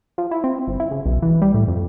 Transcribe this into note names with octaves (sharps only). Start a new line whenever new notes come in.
F3
E4
C4
G1
E4
C#3
B1
E3
G3
A2
F2